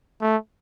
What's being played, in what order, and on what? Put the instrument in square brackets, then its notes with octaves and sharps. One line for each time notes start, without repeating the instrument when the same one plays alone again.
[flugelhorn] A3